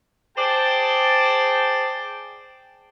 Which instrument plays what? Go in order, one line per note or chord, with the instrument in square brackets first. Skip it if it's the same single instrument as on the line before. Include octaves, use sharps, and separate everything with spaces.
[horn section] G#4 C5 D5 G5 A5